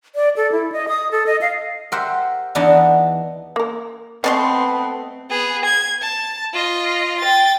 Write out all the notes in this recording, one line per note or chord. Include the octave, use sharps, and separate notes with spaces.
D5
A4
E4
D#5
D#6
A4
D#5
F5
G4 A#4 C5 E5 F#5
E2 E3 B3 D4 D#4 A5
A#3 A#4
B2 A3 B3 C4 D4 C6
B3 G#4
G#6
A5
F4 D#5
G5 A6